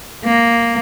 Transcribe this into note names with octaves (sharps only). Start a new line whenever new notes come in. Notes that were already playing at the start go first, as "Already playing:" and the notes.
A#3